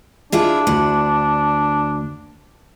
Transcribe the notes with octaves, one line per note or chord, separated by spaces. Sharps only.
D4 E4 F4 G#4
D2 F#5